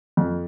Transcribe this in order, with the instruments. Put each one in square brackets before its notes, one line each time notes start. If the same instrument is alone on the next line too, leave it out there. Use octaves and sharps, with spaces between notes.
[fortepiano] F2